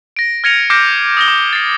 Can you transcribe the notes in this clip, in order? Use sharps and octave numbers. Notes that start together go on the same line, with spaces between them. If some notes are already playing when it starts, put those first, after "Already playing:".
A#6 D7
F6 G#6 A#6 C#7 D#7 F7
D6 F6 G6 A#6 C7 D7
D#6 A#6 G7
D6
A6 C7